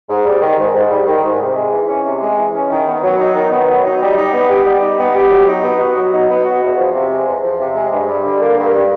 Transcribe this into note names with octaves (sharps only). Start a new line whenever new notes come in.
G#2
G3
D#3
G#2
G#2
G3
D#3
G#2
C3
G#3
E3
C#4
C3
G#3
E3
C#4
D#3
B3
F#3
D#4
D#3
B3
F#3
D#4
G3
D#4
B3
G4
G3
D#4
B3
G4
F#3
D#4
B3
F#4
F#3
D#4
B3
F#4
E2
F3
C3
G#3
E2
F3
C3
G#3
G2
G3
D3
A#3
G2
G3